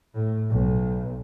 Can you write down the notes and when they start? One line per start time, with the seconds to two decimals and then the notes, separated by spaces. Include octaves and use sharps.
0.14 A2
0.50 B1